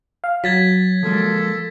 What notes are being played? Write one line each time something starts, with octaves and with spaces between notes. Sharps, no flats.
F5
F#3 G#6 A6 B6
F3 G#3 A#3 A4